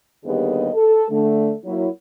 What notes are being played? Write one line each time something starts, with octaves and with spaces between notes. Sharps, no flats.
D#2 D3 G3 B3 G#4 D#5
A4
D3 A3
F#3 A#3 E4